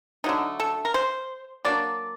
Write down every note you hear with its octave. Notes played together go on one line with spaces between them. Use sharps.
D3 F#3 A3 D#4
A4
A#4
C5
F#3 A#3 D4 D5